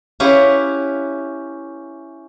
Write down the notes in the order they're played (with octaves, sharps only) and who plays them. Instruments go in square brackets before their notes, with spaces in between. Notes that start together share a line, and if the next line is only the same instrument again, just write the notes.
[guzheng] C#4 E4 G4 B4 F5 F#5